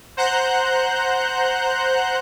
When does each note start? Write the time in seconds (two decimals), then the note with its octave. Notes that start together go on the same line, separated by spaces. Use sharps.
0.17 C5 F#5 A#5 F#6 G6